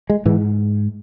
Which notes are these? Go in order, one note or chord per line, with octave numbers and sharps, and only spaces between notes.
G#3
G#2 E3